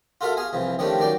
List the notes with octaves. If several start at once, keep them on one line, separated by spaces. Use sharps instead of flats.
F4 F#4 A4 A#4 E5 F5
G#4 F5 G#5
C2 E3 F3
D#3 F3 G3 A3 C#4 D4
D#3 F#3 D5 G5